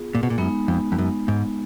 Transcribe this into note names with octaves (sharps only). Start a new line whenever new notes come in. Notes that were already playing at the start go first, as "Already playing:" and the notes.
Already playing: B3 F4 G#4
A#2
B2
A#2
F#2 G#3 B3 D#4
F2
F2
F#2
G#2